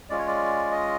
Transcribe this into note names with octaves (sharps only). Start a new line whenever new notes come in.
G#3 C#4 F4 D5
C#5
D5
D#5